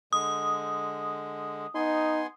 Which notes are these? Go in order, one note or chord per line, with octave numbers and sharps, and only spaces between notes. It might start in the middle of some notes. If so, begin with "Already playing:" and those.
D3 G#3 D#6
B3 D#4 G#5 C6